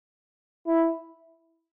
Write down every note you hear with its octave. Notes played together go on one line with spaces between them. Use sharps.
E4